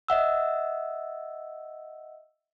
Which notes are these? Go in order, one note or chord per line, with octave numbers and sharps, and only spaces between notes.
D#5 E5 F#5 E6